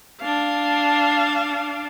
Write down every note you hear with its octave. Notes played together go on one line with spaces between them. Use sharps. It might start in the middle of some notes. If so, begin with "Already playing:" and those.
D4 F5